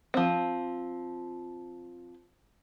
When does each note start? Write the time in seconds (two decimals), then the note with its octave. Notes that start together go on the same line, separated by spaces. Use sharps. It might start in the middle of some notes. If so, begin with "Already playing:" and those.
0.14 F3 C4